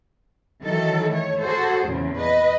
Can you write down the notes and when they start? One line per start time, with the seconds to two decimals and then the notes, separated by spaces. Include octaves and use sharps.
0.63 D#3 E3 F#3 A4
1.09 A3 C#5
1.41 F#4 G#4 A4 C5
1.87 E2 A#2 C#3
2.18 B4 D#5